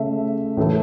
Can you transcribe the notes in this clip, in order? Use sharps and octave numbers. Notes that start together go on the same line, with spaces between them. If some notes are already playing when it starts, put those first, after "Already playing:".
Already playing: C#3 A3 E5
A2 E3 A3